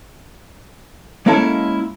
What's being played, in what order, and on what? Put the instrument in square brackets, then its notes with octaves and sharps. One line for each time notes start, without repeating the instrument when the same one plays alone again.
[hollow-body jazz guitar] G#3 A#3 C#4 E4 A4